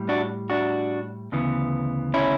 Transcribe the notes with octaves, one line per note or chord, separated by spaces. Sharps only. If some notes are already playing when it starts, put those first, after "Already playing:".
Already playing: A2 G3
D4 F#4
D4 F#4
D2 C#3 E3 B3
C#4 E4